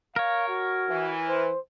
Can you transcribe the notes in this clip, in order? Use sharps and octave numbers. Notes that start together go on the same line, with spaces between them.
A#4 C#5 F5
F#4
E3
C5